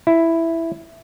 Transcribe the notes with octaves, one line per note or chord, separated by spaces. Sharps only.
E4